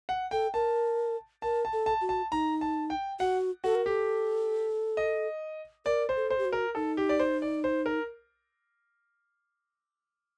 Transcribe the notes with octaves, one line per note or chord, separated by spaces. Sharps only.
F#5
A4 G5
A#4 A5
A#4 A5
A5
A4
A5
F#4
A5
D#4 A#5
A5
G5
F#4 F#5
F#4 A4
A#4
G4 A4
D#5
A#4 D5
C5
A4
C5
G4
F#4
A#4
D#4 A4
G4
D5
C5
D5
C5
A#4